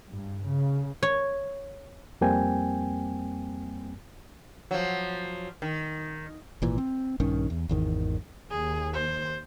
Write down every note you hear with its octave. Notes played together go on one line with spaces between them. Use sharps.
G2
C#3
C#5
F2 G3 A#3 C4 G5 G#5
F3 F#3
D#3
G#1 A#2 E3
C4
A#1 G2 D#3 C#4
E2
G#1 E2 D#3
D#2 G#4
C5